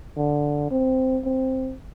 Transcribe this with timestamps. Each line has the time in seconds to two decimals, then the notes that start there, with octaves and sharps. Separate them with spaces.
0.17 D3
0.71 C4
1.25 C4